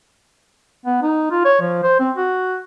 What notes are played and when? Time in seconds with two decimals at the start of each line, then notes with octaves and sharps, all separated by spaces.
0.86 B3
1.02 D#4
1.31 F4
1.45 C#5
1.62 F3
1.83 C5
2.00 C4
2.16 F#4